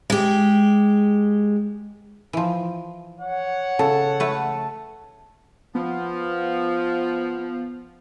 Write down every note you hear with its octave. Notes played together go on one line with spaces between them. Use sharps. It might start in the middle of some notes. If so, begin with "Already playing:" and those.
G#3 G4
E3 F3
C#5 F#5
C#3 A4
A3 B4
F3 B3